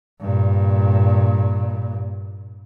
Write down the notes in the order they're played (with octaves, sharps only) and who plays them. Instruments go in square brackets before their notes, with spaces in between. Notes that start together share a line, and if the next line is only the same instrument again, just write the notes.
[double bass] G2 A#2